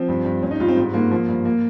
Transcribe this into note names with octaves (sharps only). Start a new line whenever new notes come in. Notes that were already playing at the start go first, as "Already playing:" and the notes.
Already playing: F3 C4
G2
G2
G2 C#4
D#4
G2 F4
C4
G#2
G#2 A#3
F3 A#3
G2
A#3